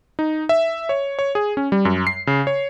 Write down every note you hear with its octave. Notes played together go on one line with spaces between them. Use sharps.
D#4
E5
C#5
C#5
G#4
C#4
G3
F#2
C7
C#3
C#5